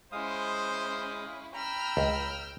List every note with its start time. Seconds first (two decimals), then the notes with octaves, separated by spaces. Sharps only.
0.12 G#3 C#4 E4 C5 F5 D#6
1.54 G5 A#5 B5 E6 F6
1.97 C#2